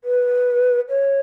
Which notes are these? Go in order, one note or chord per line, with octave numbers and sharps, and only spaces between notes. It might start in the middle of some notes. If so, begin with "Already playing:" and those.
B4
C#5